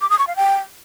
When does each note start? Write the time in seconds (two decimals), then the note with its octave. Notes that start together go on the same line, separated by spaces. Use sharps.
0.01 D6
0.10 D#6
0.19 C#6
0.27 F5
0.36 G5